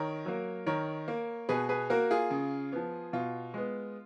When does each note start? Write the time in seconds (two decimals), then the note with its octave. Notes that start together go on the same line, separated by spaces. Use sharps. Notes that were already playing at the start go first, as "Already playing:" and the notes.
Already playing: D#3 A#4 C#5
0.25 F#3 A#3
0.66 D#3 A#4 C#5
1.08 A#3
1.49 B2 G#4 B4
1.69 G#4 B4
1.90 A#3 F#4 A#4
2.11 F4 G#4
2.30 C#3
2.72 F3 B3
3.13 B2 F4
3.54 G#3 B3